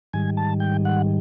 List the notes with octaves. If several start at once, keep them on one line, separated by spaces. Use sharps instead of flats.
G#2 D#3 G3 G#5
A5
G5
F#5